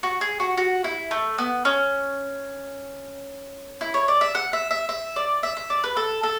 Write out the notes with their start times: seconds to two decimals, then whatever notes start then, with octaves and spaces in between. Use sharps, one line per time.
0.03 F#4
0.21 G#4
0.40 F#4
0.57 F#4
0.84 E4
1.11 A3
1.38 B3
1.65 C#4
3.81 E4
3.94 C#5
4.08 D5
4.21 E5
4.35 F#5
4.53 E5
4.71 E5
4.89 E5
5.16 D5
5.43 E5
5.57 E5
5.70 D5
5.84 B4
5.97 A4
6.23 A4